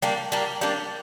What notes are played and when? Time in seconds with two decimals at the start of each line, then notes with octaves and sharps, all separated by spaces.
0.02 G3 A#3 D4
0.32 G3 A#3 D4
0.61 G3 A#3 D4